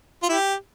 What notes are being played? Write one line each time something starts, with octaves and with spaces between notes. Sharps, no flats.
F4
E4 G4